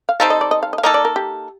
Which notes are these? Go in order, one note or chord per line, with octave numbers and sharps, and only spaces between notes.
F5
G3 C4 D#4 A4 F5
D#5
D5
D#5
F5
D#5
F5
A#3 D#4 A4 D#5
D5
A#4
G4